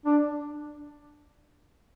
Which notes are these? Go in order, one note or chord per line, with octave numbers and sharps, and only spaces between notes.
D4